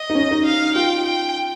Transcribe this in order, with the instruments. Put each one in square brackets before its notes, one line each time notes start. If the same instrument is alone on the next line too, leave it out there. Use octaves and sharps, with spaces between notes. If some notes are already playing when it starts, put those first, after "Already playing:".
Already playing: [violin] D#5
[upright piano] D#4
C#4
D#4
[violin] F5
[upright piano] F4 [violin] G5
[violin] G5